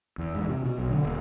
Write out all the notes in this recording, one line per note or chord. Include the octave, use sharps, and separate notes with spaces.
E2
G#2
C3
B2
B1
D3
D#1